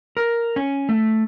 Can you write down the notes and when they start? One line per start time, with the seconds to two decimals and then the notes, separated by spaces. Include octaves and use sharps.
0.17 A#4
0.56 C#4
0.89 A3